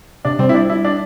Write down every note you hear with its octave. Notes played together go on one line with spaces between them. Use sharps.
C3 D4
G3 C4
E4
D4
E4
D4